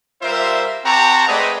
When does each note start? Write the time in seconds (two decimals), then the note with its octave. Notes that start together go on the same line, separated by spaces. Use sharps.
0.22 G3 F4 A#4 C5 E5
0.84 C4 G4 F#5 A5 A#5 C#6
1.27 G#3 A3 C4 B4 D5 D#5